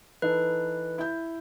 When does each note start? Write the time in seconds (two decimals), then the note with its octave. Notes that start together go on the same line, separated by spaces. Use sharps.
0.22 E3 D#4 A4 B4
0.98 E4 G6